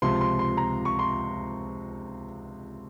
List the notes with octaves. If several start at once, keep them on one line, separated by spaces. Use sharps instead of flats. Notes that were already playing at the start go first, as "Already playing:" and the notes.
C#2 C3 F3 C6
C6
C6
A#5
C#6
C6